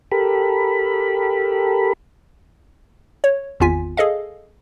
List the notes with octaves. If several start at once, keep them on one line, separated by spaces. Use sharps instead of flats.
G4 A4 A#4 B5
C#5
G#1 E2 B3 F4 G#5 B6
G#4 A4 D#5 F5